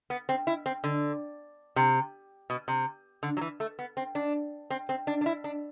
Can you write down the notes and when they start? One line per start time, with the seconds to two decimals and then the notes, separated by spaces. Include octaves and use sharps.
0.10 B3
0.29 C4
0.47 E4
0.66 C4
0.84 D3
1.76 C3
2.50 B2
2.68 C3
3.23 D3
3.37 F#3
3.41 E3
3.60 A3
3.79 B3
3.97 C4
4.15 D4
4.70 C4
4.89 C4
5.07 D4
5.21 D4
5.26 E4
5.44 D4